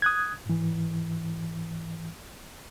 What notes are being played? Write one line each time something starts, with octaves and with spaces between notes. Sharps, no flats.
D#6 F#6 G#6
G#2 E3